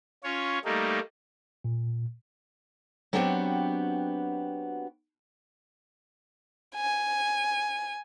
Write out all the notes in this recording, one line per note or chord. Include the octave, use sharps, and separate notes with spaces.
C#4 F4 C#5
G3 A3 A#3 D#4
A#2
F#3 B3 C4 D4 F#4 G4
G#5